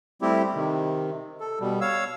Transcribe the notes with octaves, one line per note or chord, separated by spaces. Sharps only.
G3 A3 C4 E4 G4
C3 D#3
A4
B2 G3
C#5 F5 E6